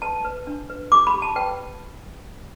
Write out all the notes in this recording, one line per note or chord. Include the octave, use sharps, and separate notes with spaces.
B4 A5
B4
D4
B4
G4 D6
B5
G4
A5
B4 G5